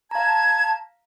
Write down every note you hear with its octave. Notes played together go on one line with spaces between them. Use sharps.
F5 A5 A#5 G#6